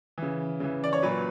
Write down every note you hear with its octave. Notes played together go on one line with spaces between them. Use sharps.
C#3 E3
C#3 E3
D5
C#5
A#2 F#3 B4